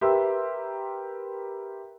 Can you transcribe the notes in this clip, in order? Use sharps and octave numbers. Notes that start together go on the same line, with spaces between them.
G4 A#4 B4 E5 C6 E6